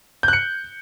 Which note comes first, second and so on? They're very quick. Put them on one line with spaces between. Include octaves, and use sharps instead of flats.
G6 F#6 C#7